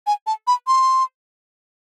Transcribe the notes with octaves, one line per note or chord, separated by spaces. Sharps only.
G#5
A5
B5
C6